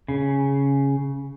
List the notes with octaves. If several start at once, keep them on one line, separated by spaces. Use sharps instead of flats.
C#3